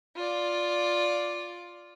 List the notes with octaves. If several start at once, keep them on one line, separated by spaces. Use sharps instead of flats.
F4 D5